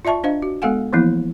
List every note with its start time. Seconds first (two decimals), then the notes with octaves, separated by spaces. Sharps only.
0.05 F4 D5 E5 A5 C#6
0.24 D4 C5 D#5 F5
0.42 F#4
0.62 G#3 B3 A4 F5 F#5 G#5
0.93 E3 F3 A#3 B3 E4